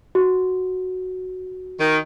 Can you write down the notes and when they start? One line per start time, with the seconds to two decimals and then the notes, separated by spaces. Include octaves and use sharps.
0.15 F#4
1.80 D#3